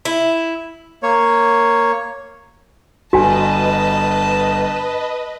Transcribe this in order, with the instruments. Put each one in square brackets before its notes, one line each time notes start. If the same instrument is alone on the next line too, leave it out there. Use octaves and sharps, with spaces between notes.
[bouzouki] E4
[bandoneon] A#3 C#5
[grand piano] G1 [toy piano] F#4 G#5 [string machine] B4 D#5 [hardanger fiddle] A5